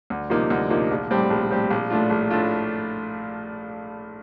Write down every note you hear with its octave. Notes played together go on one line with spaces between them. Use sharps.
D2
C3 F3 A#3 D#4
D2
C3 F3 A#3 D#4
A#1
A2 G3 C4 G4
A#1
A2 G3 C4 G4
A#1
A2 A3 D4 F4
A#1
A2 A3 D4 F4